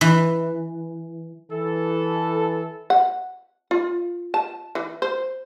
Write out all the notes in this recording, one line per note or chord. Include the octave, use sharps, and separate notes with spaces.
E3
E3 A4
F#5
F4
A5
E3
C5